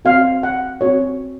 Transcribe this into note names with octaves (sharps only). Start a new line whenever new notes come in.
C4 F#4 F5
F#5
C4 F#4 C#5